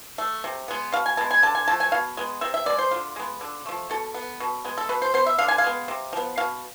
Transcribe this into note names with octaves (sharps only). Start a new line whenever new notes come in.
A3
C3
G#3 B3
B2 F5
G#5
G#3 B3 A5
G#5
D3 A5
G#5
F3 A3 A5
G#5
B2 F5
G#3 B3
C3 E5
E5
G#3 B3 D5
C5
D3 F4
G#3 B3
D3
F3 A3
B2 A4
B3
B2
G#3 B3
A4
B2 B4
C5
B3 C5
E5
D3 F5
G#5
F5
G#3 B3
C3
F3 B3
B2 F5